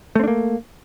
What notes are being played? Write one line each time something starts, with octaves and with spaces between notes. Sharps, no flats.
A3 A#3 C4 D4